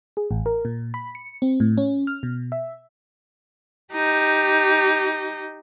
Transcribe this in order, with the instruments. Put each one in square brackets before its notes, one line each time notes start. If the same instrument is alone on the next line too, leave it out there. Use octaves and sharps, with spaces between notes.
[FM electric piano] G#4
A1
A#4
A#2
B5
C#7
C4
A2
C#4
F6
B2
E5
[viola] D#4 G4